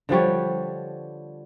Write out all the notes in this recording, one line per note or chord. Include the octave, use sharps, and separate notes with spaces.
D3 F3 G3 C#5